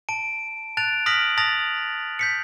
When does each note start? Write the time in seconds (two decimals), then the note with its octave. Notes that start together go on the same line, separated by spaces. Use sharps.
0.09 A5 D7
0.77 A5 F#6 A6 D7 F7
1.06 D#6 F6 A#6 B6 D7 F#7
1.37 A5 D#6 A6 A#6 F7
2.19 G6 B6 C#7